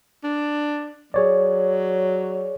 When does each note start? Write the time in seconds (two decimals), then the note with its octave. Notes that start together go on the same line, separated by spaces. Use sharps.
0.24 D4
1.14 F#3 G#4 C#5 D5